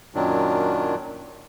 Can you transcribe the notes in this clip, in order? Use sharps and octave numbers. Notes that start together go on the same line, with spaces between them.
F#2 A#2 D#3 F#3 D4